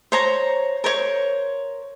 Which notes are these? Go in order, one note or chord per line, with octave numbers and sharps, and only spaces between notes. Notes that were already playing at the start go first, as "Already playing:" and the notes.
C5 C#5 A#5
A#4 C5 C#5